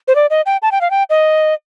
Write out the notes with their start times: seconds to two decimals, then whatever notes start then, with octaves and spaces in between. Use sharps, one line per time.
0.08 C5
0.15 D5
0.30 D#5
0.46 G5
0.62 A5
0.72 G5
0.81 F5
0.91 G5
1.10 D#5